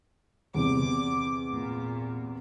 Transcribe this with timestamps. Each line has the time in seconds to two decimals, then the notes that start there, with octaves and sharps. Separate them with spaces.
0.54 E2 C3 D6
1.52 A#2